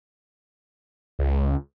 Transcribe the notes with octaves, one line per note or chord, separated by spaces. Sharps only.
C#2